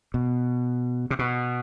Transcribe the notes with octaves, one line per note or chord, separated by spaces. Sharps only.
B2
C3
B2